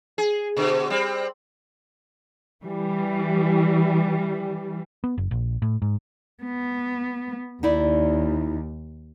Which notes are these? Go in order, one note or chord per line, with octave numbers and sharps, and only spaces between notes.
G#4
B2 D3
G3 C4
E3 G3
B3
F#1
A#1
A2
G#2
B3
D#2 D#4 E4 D5